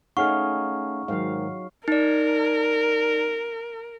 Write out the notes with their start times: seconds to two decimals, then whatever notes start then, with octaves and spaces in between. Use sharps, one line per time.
0.17 A3 C#4 D#4 G#4 F5 F#5 C#6 F6
1.08 G#2 D#3 F#3 F5
1.88 D#4 A#4 D5